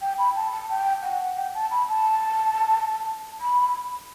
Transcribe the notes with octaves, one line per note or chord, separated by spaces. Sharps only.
G5
B5
A5
A5
G5
F#5
G5
A5
B5
A5
B5